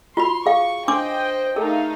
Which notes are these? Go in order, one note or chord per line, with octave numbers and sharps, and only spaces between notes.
F4 F#4 B5 C6
G#4 F5 C#6
D4 C5 D#5 G5 C6 D6
A3 D#4 G#4 A#4 F5